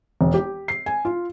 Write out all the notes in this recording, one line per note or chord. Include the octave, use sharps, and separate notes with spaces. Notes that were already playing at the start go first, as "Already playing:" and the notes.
E1
G4
C7
G#5
F4